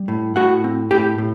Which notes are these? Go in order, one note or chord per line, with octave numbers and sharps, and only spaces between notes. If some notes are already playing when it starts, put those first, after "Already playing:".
Already playing: G3
A2
A2 F#4 F#5
C4
A2 G4 G5
A2